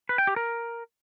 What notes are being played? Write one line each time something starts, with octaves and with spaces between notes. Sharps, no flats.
B4
G5
G4
A#4